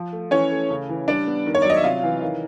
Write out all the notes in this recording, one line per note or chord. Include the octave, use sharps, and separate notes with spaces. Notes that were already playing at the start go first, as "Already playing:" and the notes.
Already playing: F3
A3
E3 C#4 C#5
A3
C#3
E3
G3 D4 D5
B3
D#3
C#5
F#3 D5
D#5
E5
C3 F4 F5
E3
D#3